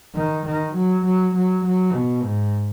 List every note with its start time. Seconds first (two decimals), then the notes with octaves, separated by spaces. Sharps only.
0.15 D#3
0.45 D#3
0.74 F#3
1.04 F#3
1.34 F#3
1.64 F#3
1.93 B2
2.23 G#2